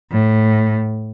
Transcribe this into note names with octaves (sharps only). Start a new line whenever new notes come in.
A2